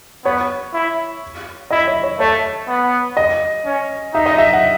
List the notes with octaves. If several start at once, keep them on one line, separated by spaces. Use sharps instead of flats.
B3 C#5
E4
E4 D#5
C#5
C#5
A3 C#5
B3
D#5
C#4
D#4 E5
D#5
E5
F#5